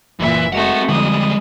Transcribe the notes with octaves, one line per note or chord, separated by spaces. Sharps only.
F#1 A#2 E3 E5
G#3 A3 C4 F#4 F#5
F2 D3 G3 G#3 D#6